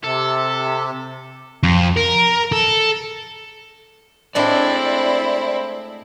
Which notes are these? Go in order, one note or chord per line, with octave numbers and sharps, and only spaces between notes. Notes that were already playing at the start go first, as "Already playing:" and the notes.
C3 A4
F2
A#4
A4
A2 G#3 C4 D4 E4 D5